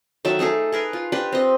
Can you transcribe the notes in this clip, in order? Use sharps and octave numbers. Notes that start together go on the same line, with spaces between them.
D#3 F#3 A4 E5
A3 D#4 G#4 A4
G#4 A#4 B4
F4
D4 G4 B4
C4 D#5